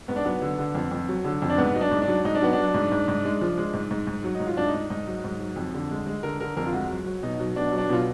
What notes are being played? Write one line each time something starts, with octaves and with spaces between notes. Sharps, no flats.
G#2 B3
D4
F#3 B3
D3
D3
F2
F2
F#3
D3
F2
D4
G#2 B3
F#3 D#4
D4
G#2
D4
F#3
G#2 D#4
D4
F#3 B3
D4
F#3
G#2
G#2
G#2
G#3
F3
G#3
G#2
G#2
G#2
F#3
D#4
G#2
F4
G#2 D4
D#4
G#2
G#2 D#4
F#3
G#2
F#3
F2
D3
G#3
G#3
D3 A#4
D3 A#4
F2 A#4
F4
G#3 F#4
F#3
F#3
B2 D#4
F#3
B2 D4
F#3
D4
B2 F4